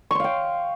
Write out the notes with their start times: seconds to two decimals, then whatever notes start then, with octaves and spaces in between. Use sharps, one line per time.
0.11 C#6
0.15 C6
0.20 F5
0.24 G5